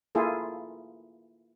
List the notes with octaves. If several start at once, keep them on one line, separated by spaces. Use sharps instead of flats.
A#3 E4 F4 G#4 A4